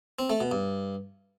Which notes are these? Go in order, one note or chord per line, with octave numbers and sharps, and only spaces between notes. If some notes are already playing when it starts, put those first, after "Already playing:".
C4
A3
B2
G2